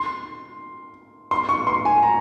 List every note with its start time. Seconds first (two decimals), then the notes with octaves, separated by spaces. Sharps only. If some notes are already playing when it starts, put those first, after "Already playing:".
Already playing: C6
1.31 C6
1.49 C#6
1.67 C6
1.85 G#5
2.03 A#5